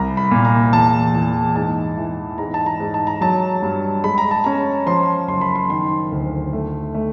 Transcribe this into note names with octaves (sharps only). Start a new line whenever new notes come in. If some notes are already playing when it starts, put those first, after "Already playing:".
Already playing: C2 A#5
B5
A#2
A#5
E2 A5
E2
G#2 A5
E3
G#2 A#5
A5
A#5
G#2
A5
A#5
F#3 A5
G2
G#3 B5
A#5
A5
C#4 A#5
F3 C6
F#1 C6
B5
C6
D#3 C6
D2
A3
A3